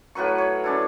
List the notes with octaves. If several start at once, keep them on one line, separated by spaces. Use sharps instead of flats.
A2 F#3 B4 C#6
C#5
C#4 D4 E4